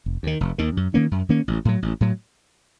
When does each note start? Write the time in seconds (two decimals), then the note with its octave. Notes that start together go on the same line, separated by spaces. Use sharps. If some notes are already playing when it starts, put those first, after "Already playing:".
0.06 F1
0.23 D#2 D#3
0.41 F1
0.58 D#2 D#3
0.77 F#2
0.94 D#3 A#3 C#4
1.11 F#2
1.29 D#3 A#3 C#4
1.48 A1
1.65 A2 F#3
1.82 A1
2.01 A2 F#3